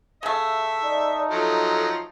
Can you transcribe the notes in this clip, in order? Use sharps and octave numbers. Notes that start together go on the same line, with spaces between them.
C#3 A3 E5
D#4 D5
F3 F#3 A4 A#5